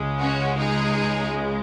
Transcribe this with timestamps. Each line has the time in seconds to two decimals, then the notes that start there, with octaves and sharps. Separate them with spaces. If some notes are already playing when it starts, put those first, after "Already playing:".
Already playing: C#2 C#3 G#3
0.19 C#4 F#4
0.58 D#4 G#4